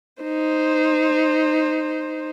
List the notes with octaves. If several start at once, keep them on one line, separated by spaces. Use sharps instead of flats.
D#4 C5